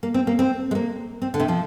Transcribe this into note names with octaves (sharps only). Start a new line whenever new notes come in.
A#3
C4
A#3
C4
G#3
A#3
C4
D3
C3
F3